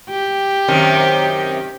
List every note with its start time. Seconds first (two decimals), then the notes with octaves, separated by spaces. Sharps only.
0.10 G4
0.68 F#2 C3 D#3